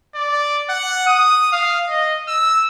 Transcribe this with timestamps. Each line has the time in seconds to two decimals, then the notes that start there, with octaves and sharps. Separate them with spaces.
0.15 D5
0.69 F#5
1.07 D#6
1.52 F5
1.89 D#5
2.28 E6